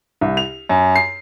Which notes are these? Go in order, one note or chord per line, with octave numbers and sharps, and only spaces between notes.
C2
F7
F#2
C7